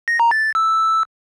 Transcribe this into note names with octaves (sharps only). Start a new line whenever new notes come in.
A#6
A#5
A6
A6
E6